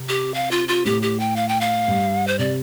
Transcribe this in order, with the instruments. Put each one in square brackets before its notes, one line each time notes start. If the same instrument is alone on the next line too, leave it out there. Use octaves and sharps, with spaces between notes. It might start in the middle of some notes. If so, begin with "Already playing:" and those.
Already playing: [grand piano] C3
[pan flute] G4
F5
F4
F4
[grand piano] A2 [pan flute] G4
[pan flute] G4
G5
F5
G5
F5
[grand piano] G2
[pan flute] C5
[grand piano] C3 [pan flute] D5